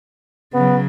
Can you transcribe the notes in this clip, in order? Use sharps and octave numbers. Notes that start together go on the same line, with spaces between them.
C#3 F#3 B3